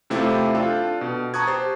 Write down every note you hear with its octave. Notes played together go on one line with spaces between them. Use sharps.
C3 A3 C4 E4 F4 G4
D4 F4 A4 G5
B2
A5 A#5 C#6 D#6 F#6 G#6
G4 C5 A6